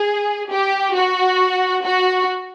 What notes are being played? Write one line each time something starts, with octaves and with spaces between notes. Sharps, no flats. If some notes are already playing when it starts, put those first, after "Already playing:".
Already playing: G#4
G4
F#4
F#4